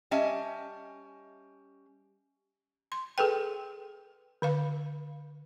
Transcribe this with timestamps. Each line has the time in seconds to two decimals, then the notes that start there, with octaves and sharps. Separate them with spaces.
0.11 G3 C#4 D#5 E5 G#5 A5
2.92 C6
3.18 G#4 A4 B4 G5
4.42 D3 B4 F5